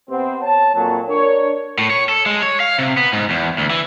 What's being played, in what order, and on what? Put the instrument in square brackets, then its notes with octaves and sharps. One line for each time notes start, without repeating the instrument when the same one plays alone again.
[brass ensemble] C3 B3 C4
C#5 A5
F2 A#2 F#3
D4 A#4 C#5
[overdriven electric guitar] A2
C#5
A4
G#3
C#5
F5
C3
B3
G#2
E2
D2
E3